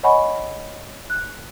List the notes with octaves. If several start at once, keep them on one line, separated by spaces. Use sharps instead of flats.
C#5 D#5 F#5 G#5 B5 C#6
F#6